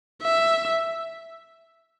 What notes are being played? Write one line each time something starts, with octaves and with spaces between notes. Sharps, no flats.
E5